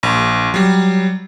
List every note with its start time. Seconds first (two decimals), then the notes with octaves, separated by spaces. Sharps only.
0.03 A#1
0.54 F#3 G3